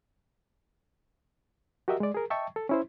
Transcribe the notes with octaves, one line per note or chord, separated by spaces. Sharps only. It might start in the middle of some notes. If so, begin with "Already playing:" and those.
F#4 G4 A#4 D#5 E5
G#3 D5
G#4 A#4
D#5 E5 G5 A5 C#6
A4
C#4 E4 C5